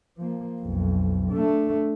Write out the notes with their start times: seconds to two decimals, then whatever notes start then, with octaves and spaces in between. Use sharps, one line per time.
0.17 F3 A#3
0.62 B1 F2
1.30 A3 D4